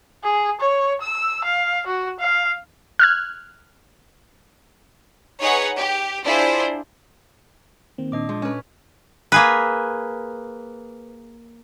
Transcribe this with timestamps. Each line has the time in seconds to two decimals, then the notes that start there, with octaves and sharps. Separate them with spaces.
0.24 G#4
0.61 C#5
1.01 E6
1.45 F5
1.87 F#4
2.20 F5
2.99 F6 F#6 G#6
5.40 D#4 G#4 B4 C#5 F#5
5.76 G4
6.25 D4 E4 F4 G#4 C5
7.98 D#3 A#3 C4
8.12 A#2 D4 D#5 D6
8.29 F3 G#3
8.42 C#4 B4
9.32 A#3 G#4 B4